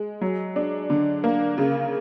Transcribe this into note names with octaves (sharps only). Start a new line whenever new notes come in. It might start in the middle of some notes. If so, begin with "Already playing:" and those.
Already playing: G#3
F#3
D4
D3
A#3
C#3